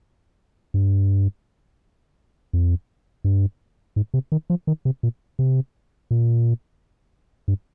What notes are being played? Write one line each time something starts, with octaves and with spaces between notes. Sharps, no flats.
G2
F2
G2
G#2
C3
D#3
F3
D#3
C3
A#2
C3
A#2
G2